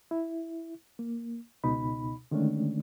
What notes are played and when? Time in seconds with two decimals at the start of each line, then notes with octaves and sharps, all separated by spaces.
0.11 E4
0.99 A#3
1.64 C#2 B2 D#4 B5
2.31 D3 D#3 G#3 A3 C#4 D4